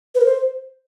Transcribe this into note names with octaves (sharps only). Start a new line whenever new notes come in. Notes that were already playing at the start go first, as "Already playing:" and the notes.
B4
A#4
C5